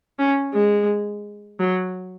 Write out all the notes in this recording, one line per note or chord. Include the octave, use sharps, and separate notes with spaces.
C#4
G#3
F#3